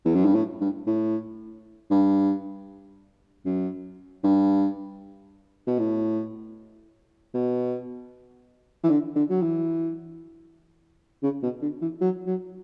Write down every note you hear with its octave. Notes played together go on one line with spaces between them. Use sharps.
E2
F#2
G2
A2
G2
A2
G2
F#2
G2
B2
A2
B2
E3
D3
D3
F#3
E3
C#3
B2
D3
E3
F#3
F#3